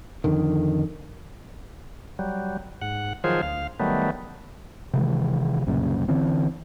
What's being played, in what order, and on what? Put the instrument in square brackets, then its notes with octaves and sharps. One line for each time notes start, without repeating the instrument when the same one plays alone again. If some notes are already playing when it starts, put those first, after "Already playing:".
[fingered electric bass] F2 D3 D#3
[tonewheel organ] F#3 G3
G#2 F#5
D#3 F3 F#3 F4 G#4 C5
D2 F5
D#3 F#3 G3 A3 B3
[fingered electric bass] C3 D#3 E3 G#3
C2 F#2 A#2 C#3
D3 E3 C4